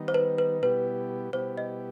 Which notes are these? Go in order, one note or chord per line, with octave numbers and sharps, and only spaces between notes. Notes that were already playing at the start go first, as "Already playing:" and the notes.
Already playing: D#3 G3 B3 D#4
C5
B4
B4
B2 G3 B3 E4 G4 B4
B2 G3 B3 E4 G4 C5
D#5